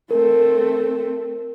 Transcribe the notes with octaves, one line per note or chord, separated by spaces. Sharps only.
A3 C4 A#4